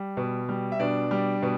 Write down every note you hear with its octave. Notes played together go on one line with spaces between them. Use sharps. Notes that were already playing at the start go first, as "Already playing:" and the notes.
Already playing: G3
B2
G3
E5
B2 D4 D5
G3
B2